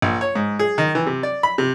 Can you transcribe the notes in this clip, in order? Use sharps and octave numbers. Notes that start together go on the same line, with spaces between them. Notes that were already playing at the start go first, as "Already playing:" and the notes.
A#1
C#5
G#2
G#4
D#3
E3
C3
D5
B5
C3